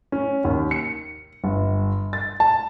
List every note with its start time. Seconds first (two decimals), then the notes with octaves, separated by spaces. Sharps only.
0.12 C#4
0.44 D#2
0.71 C#7
1.44 G1
2.13 A6
2.40 A5